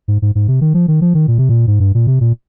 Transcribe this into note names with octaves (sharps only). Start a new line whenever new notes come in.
G#2
G#2
G#2
C3
D#3
F3
D#3
F3
D#3
A#2
C3
A#2
G#2
G2
A#2
C3
A#2